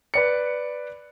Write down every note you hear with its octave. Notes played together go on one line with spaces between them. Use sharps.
B4 D5 C#7